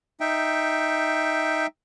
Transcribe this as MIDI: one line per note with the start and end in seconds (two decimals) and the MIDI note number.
0.21 1.67 63
0.21 1.67 76
0.21 1.67 79